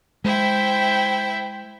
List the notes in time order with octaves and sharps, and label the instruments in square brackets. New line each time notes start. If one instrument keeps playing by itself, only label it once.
[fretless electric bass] G#3 [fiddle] E4 E5 [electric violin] C5 G5